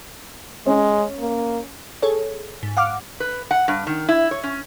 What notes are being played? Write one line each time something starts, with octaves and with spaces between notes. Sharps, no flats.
G#3 C#4
A#3
G#4 A4 C#5
G#2
F5 F#5 D6 F6
B4
F#5
G2
D#3
E4
C#5
C#4